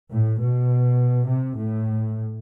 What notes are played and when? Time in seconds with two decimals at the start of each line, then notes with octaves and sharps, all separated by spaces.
0.10 A2
0.39 B2
1.27 C3
1.58 A2